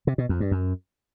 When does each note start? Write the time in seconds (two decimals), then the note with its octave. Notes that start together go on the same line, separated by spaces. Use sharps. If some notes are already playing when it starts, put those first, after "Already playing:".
0.07 C3
0.18 B2
0.29 F2
0.40 G2
0.51 F#2